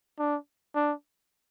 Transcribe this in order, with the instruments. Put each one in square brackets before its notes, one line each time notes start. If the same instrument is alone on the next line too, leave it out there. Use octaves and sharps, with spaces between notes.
[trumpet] D4
D4